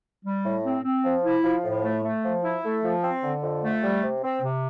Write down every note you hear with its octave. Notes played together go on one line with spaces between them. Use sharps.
G3
A2
C4
C4
F3
E4
F3
A2
A3
A3
F3
E4
A3
F3
C4
D3
F2
A3
G3
C3
C4
C3